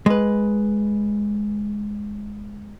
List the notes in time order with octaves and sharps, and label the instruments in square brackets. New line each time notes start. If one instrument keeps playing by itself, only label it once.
[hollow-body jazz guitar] G#3 B4